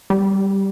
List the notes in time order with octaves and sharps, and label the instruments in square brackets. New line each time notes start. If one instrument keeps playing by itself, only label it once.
[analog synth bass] G3